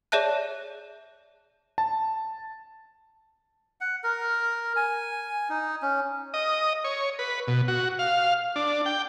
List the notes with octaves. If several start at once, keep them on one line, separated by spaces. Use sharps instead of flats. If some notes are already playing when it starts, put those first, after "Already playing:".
G#4 C#5 D5 E5 A5 F#6
A5
F#5
A#4
G#5
D#4
C#4
D#5
C#5
B4
B2
F#4
F5
D4
G5